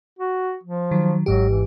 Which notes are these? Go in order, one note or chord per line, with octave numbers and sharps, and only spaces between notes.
F#4
F3
D#3 F#3
G#1 G#2 F#3 G4
E3